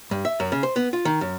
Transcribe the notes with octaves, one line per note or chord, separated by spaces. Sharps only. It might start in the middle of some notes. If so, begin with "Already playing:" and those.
G2
E5
F#2
C#3
C5
B3
F4
D#3
F#2